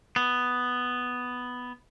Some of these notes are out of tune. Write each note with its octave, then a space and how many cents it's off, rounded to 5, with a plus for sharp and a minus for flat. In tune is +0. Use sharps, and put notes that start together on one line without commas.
B3 +5